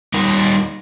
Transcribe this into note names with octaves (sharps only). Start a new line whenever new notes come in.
G3 D#4 A#4